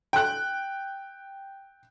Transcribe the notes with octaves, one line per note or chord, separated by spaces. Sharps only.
G5 F#6